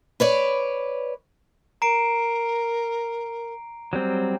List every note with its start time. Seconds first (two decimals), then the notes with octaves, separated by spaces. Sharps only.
0.20 B4 C#5 D5
1.82 A#4 A#5 C7 D7
3.93 F#3 G3 C4